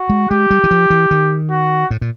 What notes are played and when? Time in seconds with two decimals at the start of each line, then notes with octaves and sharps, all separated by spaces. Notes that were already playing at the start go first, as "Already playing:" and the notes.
Already playing: F#4
0.09 G#3
0.30 G#3 G4
0.51 G3
0.64 E3
0.71 F3
0.90 E3
1.11 D#3
1.50 F#4
1.91 A2
2.01 A#2